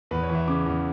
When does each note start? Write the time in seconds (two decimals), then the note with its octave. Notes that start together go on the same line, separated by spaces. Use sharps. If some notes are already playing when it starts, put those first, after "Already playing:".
0.11 E2 B4
0.23 C#5
0.29 E3
0.35 E5
0.47 C#3 D6
0.66 E2